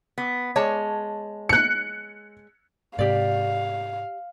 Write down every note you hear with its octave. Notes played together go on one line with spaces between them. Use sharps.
B3
G#3 C#5 A5
F#6 C#7
G#2 C3 G4 D5 F5